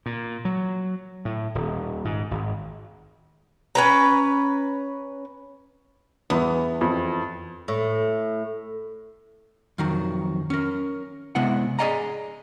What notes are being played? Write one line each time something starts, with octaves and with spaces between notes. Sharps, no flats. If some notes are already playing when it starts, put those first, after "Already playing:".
A#2
F#3
A2
D#1
G#2
G#1
C#4 B4 A#5
E2 B3
F2
A2
F2 D#3 F#3
C#4 A#4
C3 G#3 B3 E4 F#5
G#4 A#4 D5 D#5 G#5 A#5